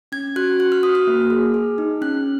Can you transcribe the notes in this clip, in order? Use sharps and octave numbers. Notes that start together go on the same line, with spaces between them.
C#4 G#6
F#4 F#6
F#4 F#6
F6
F#4 D#6
F6
A#3
G#4
G#4
D#4
C#4 F#6